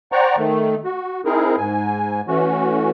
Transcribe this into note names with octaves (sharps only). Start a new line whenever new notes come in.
C5 D5 F#5 G5 A#5 C#6
D#3 A3
F#4
C4 D#4 E4 G#4 A#4
G#2 G#5
E3 A3 C#4 F#4